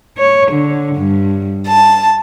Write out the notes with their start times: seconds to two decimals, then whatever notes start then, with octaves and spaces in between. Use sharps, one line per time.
0.18 C#5
0.52 D3
0.96 G2
1.67 A5